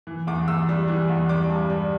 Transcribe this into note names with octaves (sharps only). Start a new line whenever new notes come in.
E3
E2 D6
E2 E6
G3
E3
E2
G3 D6
G2
G3